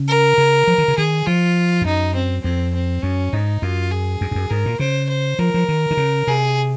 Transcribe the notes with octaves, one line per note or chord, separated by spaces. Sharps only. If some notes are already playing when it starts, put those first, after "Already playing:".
Already playing: C#3
A#4
C#3
F3
D#3
C#3
D#3 G#4
F3 F4
G#2
F#2 D#4
C4
F2 C4
C4
F#2 C#4
G#2 D#4
F#2 F4
G#4
F#2
G#2
F#2
G#2 A#4
A#2
C#3 C5
C5
F3 A#4
F3
D#3
D#3
C#3
C3 G#4